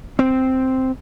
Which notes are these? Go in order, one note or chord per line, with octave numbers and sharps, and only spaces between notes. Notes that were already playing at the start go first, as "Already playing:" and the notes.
C4